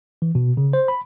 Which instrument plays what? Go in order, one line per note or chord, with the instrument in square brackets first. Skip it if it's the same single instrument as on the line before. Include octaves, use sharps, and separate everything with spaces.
[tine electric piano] E3
B2
C#3
C5
B5